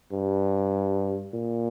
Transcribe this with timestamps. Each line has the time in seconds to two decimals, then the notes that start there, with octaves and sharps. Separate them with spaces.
0.12 G2
1.34 A#2